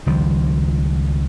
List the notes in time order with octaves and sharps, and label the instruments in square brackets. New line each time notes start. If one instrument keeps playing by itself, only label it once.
[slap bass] C#2 D#3 F3 G3